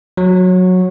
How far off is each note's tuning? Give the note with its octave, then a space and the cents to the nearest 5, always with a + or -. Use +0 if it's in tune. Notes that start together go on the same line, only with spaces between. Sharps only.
F#3 -15